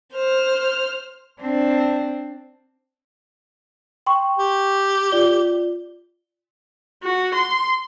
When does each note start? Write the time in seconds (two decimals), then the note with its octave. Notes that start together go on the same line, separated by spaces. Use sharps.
0.14 C5 F6
1.41 C4 D4
4.06 G5 C6 C#6
4.38 G4
5.12 F4 D5 G7
7.04 F#4
7.35 C6